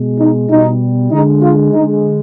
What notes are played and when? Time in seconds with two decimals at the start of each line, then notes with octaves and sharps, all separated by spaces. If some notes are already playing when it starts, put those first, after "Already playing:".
Already playing: B2 G#3
0.19 D#4
0.50 B2 G3 D#4
1.11 D3 G#3 D#4
1.42 F4
1.72 D3 G#3 D#4